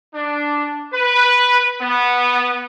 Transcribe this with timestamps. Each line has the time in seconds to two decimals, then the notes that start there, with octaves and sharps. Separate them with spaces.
0.14 D4
0.93 B4
1.81 B3